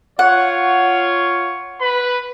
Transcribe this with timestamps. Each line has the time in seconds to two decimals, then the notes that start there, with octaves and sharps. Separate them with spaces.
0.19 F4 C#5 F#5
1.81 B4 B5